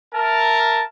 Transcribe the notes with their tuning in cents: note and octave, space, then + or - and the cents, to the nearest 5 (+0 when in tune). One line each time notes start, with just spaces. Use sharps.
A#4 +0 E5 +0 A5 +0